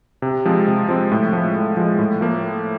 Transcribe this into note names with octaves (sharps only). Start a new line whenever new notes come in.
C3
F3 G#3 C4
C3
F3 G#3 C4
A2
F3 G#3
A2
F3 G#3
A2
F3 A#3